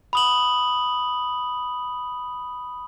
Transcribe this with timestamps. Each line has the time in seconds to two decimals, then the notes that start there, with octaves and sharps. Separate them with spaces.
0.13 B5 D#6 F#7